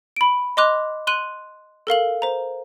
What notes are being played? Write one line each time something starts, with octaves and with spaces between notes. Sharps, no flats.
B5 D7
D#5 C6 D6 F#6 F7
C6 F#6 D#7 F#7
A4 A#4 F5 F#7
C5 A#5